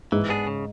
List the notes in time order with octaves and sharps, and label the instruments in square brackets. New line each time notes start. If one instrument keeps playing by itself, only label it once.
[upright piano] G#2 [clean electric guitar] E3
[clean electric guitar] B3 D4 G#4
C#3